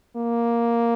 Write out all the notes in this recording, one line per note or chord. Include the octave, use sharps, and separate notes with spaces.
A#3